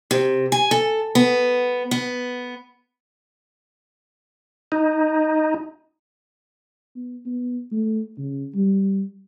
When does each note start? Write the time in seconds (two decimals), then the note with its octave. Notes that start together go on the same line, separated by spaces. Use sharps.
0.11 C3
0.52 G#5
0.71 A4
1.15 B3
1.91 B3
4.72 D#4
6.95 B3
7.26 B3
7.72 A3
8.18 C#3
8.55 G3